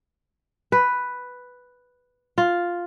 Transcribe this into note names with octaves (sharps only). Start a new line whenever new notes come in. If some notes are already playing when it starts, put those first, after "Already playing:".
B4
F4